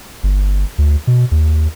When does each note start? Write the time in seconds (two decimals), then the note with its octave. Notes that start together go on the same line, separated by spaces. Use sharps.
0.23 G1
0.78 D2
1.07 B2
1.31 D#2